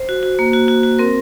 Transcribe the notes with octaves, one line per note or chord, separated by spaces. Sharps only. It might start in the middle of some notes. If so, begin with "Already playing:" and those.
Already playing: C5
F#4
F#4
A#3
F#4
F#4
F#4
C4 A#4